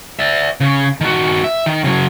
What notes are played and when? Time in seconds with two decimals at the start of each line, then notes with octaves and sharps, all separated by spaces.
0.19 D5 E5
0.60 C#3
1.01 D#3 F#4
1.44 E5
1.66 D#3
1.84 C#3 F#3